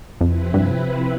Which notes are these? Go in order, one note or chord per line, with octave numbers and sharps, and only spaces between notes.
F2 C3 F3 C4 E4 B4
G2